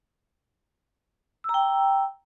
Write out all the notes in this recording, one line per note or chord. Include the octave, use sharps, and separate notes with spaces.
G5 A#5 E6